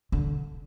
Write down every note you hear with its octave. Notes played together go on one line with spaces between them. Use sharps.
D3